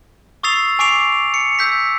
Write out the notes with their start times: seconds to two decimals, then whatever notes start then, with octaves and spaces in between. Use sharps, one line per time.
0.43 C#6 D#6 E6 A6 C7 F7
0.79 G#5 C#6 D6 C7 D7 F7
1.34 C#7
1.59 E6 G6 B6